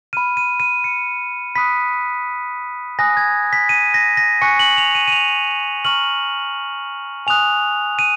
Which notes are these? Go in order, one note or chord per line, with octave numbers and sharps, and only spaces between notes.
B5 F6 D#7
D#7
D#7
C#7
B5 D#6 F#6 B6
G#5 D#6 F#6 A#6
G#6
B6
D#7
A#6
A#6
G#5 C#6 F#6 C#7
F#7
F7
D#7
D#7
F7
A#5 C#6 F6 F#7
G#5 D#6 F#6 F7
D#7